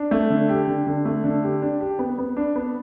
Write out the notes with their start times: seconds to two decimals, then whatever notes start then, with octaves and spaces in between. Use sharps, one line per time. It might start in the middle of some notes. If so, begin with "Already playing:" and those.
Already playing: D4
0.11 A3
0.30 D3
0.49 G4
0.67 D3
0.87 D3
1.05 A3
1.24 D3
1.43 G4
1.62 D4
1.81 G4
1.99 B3
2.19 B3
2.37 D4
2.56 B3